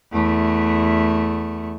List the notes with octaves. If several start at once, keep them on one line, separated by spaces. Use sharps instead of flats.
E2 A3